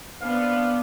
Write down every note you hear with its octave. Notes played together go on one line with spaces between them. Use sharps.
B3 C4 D4 F5